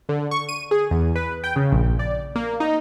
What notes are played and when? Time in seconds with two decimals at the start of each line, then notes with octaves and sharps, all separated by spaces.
0.09 D3
0.31 C#6
0.49 D#7
0.71 G#4
0.91 E2
1.15 B4
1.44 G5
1.56 C#3
1.72 A#1
1.99 D5
2.36 A#3
2.60 D#4